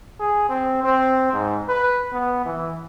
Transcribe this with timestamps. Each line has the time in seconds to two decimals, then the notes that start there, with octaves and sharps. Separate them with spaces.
0.20 G#4
0.49 C4
0.84 C4
1.33 G#2
1.69 B4
2.13 B3
2.45 E3